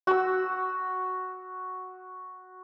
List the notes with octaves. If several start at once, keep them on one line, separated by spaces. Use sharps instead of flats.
F#4 E6